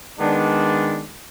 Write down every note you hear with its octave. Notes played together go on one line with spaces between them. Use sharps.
D#3 G#3 B3 D4